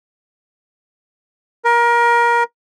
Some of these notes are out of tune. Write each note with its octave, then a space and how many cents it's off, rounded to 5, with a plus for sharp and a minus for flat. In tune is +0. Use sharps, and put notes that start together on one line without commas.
A#4 +25